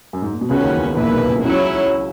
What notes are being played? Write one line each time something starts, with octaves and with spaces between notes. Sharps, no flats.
F#2
G#2
A#2
B2
C#2 C#3 C#4 F#4 B4
D#2 D#3
E2 E3
D#2 D#3
A#1 A#2 A#3 E4 B4
B1 B2
C#2 C#3
C#2 C#3 F#3 C#4 E4